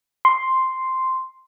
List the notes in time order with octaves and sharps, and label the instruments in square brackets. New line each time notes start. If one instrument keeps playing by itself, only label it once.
[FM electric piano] C6